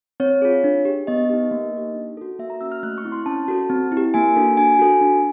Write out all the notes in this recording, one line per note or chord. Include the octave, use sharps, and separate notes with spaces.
C4 C#5
F4 G#4
D4
G4
B3 D#5
D#4 G4
A#3
D#4 G4
D4
F#4 A4
A#3 E5
A#5
C#4 F#4 E6
F6
A3 F#6
C#6
C4 E4
C6
C#4 A5
F#4 A4
C4
E4
G4
A#3 G#5
D4 F#4 A4
D4 G#5
F#4 A4
D4